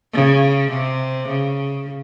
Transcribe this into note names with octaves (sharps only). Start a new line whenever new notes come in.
C#3
C3
C#3